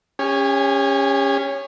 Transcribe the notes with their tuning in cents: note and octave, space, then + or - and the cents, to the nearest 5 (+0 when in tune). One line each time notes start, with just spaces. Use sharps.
C#4 +0 G4 +45 G#5 +0